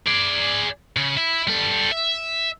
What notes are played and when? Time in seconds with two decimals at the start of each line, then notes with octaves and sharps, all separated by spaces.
0.07 G#4 D5
0.96 C#3
1.17 E4
1.47 G3 A4
1.92 E5